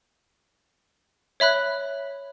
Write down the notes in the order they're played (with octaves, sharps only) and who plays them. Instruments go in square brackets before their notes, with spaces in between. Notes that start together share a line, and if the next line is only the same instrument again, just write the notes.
[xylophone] C#5 E5 B5 F#6